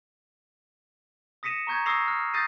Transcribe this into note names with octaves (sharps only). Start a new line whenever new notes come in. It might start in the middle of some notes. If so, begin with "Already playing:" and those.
D#6 A#6 B6 C#7 D#7 E7
A#5 C#6 G6 G#6
C#6 D#6 E6 A#6 C7 F7
F6
D#6 G6 A6 A#6 C7 D#7